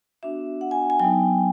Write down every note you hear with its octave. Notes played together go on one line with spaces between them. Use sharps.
B3 D4 F#4 E5
F#5
G#5
G#5
F#3 B3 D#4 G5